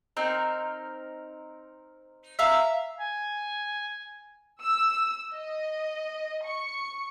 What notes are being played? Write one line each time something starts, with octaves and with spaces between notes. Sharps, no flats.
C4 D#4 A#4
E5 F5 A#5
G#5
E6
D#5
C#6